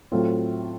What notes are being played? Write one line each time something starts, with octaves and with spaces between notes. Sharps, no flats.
A2 F#3 A3 C4 F4